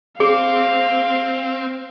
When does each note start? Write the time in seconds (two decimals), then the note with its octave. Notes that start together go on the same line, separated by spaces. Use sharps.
0.20 C4 G#4 F5 D6